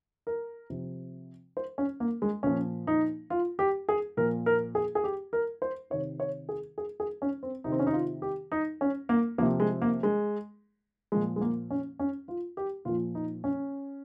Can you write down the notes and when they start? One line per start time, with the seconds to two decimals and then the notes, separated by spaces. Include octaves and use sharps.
0.27 A#4
0.70 C3 F3
1.57 C5
1.78 C#4
2.00 A#3
2.22 G#3
2.43 A#2 F3 C#4
2.87 D#4
3.30 F4
3.59 G4
3.89 G#4
4.17 A#2 F3 A#4
4.46 A#4
4.75 G#4
4.95 G#4
5.04 G4
5.33 A#4
5.62 C5
5.90 C3 D#3 C#5
6.20 C#5
6.49 G#4
6.78 G#4
7.00 G#4
7.22 C#4
7.43 C4
7.64 C3 D#3 D#4
7.72 C4
7.79 C#4
7.87 D#4
7.93 F4
8.22 G4
8.52 D#4
8.81 C#4
9.09 A#3
9.38 F3 A#3
9.42 C3
9.60 G#3
9.82 A#3
10.03 G#3
11.12 A#2 F3 G#3
11.36 G#3
11.41 A#3
11.71 C#4
11.99 C#4
12.28 F4
12.57 G4
12.85 A#2 F3 F4
13.15 D#4
13.44 C#4